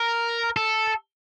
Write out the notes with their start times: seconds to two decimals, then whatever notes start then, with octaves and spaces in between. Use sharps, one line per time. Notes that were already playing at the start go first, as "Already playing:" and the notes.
Already playing: A#4
0.56 A4